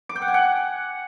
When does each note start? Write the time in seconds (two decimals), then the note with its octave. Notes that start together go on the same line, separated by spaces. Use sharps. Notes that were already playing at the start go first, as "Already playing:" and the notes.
0.09 D6
0.16 G5
0.22 F#5
0.28 G#5
0.34 F#5